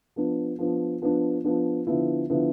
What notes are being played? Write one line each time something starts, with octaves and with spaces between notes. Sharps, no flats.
F3 B3 D4
F3 B3 D4
F3 B3 D4
F3 B3 D4
D3 F3 B3 E4
D3 F3 B3 E4